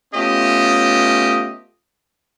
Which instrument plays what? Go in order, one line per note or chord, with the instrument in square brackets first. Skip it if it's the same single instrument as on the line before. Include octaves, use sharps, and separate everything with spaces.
[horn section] A3 B3 C#4 F4 G4 D#5